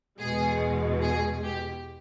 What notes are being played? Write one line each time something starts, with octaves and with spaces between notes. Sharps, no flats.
E2 B2 G#3 G#4
G#4
G4